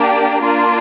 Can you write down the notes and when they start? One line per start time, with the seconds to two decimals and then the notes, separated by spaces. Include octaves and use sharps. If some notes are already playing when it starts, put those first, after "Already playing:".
Already playing: A#3 D4 G4
0.42 A#3 D4 F4